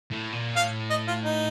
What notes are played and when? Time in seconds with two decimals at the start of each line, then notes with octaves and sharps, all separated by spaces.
0.11 A2
0.32 A#2
0.55 A2 F5
0.90 D#5
1.08 F4
1.24 D#4